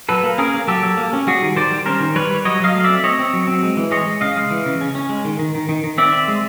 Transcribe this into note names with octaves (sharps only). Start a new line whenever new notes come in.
F#3 A4 B4
A#3
C#4 G#4 A#4
A#3
F#3 G4 A4
F#3
A#3
C#4
G3 F#4 G#4
D#3
D#3 C5 D5
G3
C#4 A#4 C5
D#3
G3 B4 C#5
G3
F#3 C#5 D#5
F#3 D#5 F5
A3
C4 D5 E5
C4 C#5 D#5
C4
F#3
C4
G#3
E3
G#3 C#5 D#5
G#3
C#3 D#5 F5
G#3
E3
C#3
C#4
C#4
G#3
D#3
D#3
D#3
D#3
D#3
C4 D5 E5
C4
G#3